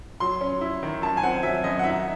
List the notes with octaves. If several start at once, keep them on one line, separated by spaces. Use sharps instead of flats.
F#3 C6
C#4
E4
D#3
F#2 A5
G#5
C4 F#5
F#3 E5
F#2 D#5
F#5
D#4 E5